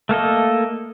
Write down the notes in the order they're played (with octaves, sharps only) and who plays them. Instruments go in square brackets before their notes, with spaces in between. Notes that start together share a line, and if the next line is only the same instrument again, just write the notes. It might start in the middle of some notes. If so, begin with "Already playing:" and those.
[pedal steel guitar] A3 A#3 A4 D#5